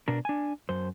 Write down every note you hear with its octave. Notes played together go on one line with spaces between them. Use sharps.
B2 D4 A#4
D4 G#5
F#2 C5